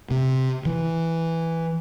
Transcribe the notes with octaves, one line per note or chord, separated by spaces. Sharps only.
C3
E3